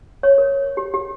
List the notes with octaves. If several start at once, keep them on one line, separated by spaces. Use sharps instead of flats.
C#5
A#4
G4
G4